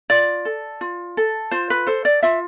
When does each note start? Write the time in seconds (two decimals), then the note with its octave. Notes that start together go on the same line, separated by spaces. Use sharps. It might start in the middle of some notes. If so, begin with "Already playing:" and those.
0.10 F4 D5
0.45 A4
0.81 F4
1.17 A4
1.51 F4 C5
1.70 B4
1.87 A4 C5
2.05 D5
2.23 F4 E5